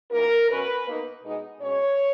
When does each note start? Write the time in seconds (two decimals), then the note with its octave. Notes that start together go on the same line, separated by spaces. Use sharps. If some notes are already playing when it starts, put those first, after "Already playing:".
0.12 F#2 E3 A#3 D#4 A#4
0.49 B2 F#3 C#4 B4
0.86 B2 A#3 D#4
1.24 B2 G#3 B3 D#4
1.61 B2 G#3 C#4 C#5